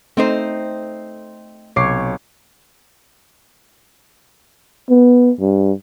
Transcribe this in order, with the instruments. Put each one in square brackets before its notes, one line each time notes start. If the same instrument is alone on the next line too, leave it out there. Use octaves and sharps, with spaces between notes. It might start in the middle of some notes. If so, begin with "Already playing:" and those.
[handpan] A3 [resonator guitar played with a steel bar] C4 D#4 C5
[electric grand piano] B1 D6 C7 [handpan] C3 C#5
[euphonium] B3
G2